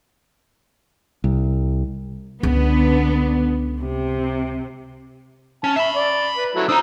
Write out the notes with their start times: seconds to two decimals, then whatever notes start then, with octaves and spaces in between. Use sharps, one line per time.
1.24 C2
2.43 C#2 D3 B3
3.81 C3
5.64 C#4 A5
5.76 E5 A5 B5
5.95 D5
6.37 B4
6.55 F#3 A3 E4
6.69 D4 C5 A#5 D#6 E6